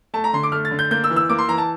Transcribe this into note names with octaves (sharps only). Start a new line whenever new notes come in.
A3 A5
A#5
D3 C6
D6
A3 F6
A6
D3
G6
A#3 G6
E6
E3
E6
A#3 D6
C6
E3 A#5
A5